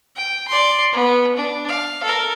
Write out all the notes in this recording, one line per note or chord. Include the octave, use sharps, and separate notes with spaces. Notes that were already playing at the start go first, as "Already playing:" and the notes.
G5
D5 C6
B3
D4
F5
A4 A#4